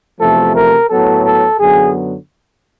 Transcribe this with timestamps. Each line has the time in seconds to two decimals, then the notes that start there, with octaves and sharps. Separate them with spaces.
0.19 E2 C3 F3 A3 A4
0.55 A#4
0.90 A2 F#3 B3 A4
1.24 A4
1.59 F#2 D3 F#3 B3 G#4